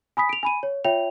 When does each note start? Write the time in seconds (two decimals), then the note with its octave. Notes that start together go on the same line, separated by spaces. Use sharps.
0.17 G#5 B5 D#6 B6
0.29 D7 F7
0.43 G#5 B5 D#7
0.63 C#5
0.84 F4 C#5 E5 G5 F7